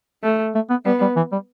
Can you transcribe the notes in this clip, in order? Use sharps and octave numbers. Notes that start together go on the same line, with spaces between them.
A3
A3
B3
G3 B3
G3
E3
G3